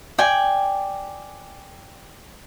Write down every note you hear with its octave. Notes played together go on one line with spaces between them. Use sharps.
D5 G5 G#5